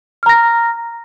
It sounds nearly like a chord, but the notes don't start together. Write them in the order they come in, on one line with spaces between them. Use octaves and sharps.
F6 A#5 A#6